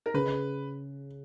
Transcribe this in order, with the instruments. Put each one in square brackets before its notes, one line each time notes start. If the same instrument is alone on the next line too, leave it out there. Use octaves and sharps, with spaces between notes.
[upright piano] A#4
[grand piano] C#3 [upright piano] B4